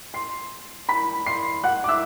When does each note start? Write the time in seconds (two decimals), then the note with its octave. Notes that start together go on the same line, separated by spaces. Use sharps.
0.14 C6 C7
0.89 B5 B6
1.26 C6 C7
1.64 F#5 F#6
1.84 D6
1.88 E5 E6